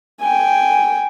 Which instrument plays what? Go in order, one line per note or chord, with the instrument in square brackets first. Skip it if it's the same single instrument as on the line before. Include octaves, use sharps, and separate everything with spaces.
[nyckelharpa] G5 G#5